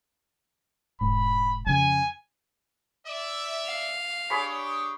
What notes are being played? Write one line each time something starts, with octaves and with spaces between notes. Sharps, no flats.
E1 G#2 B5
F2 C#3 G#5
D5 E5
F5
D4 G4 G#4 C#5 B5